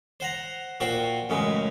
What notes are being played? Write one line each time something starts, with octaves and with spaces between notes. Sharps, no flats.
C5 F#5 A#5
A#2 F#4 C5 G5 C6
A1 F#2 C#3 G#3